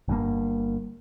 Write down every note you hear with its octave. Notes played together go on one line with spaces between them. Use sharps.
G1 G2 D3 A#3